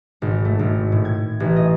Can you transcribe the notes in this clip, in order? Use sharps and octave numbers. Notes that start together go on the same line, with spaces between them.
G#1
A3
G#1
A2
G#6
A1
D#5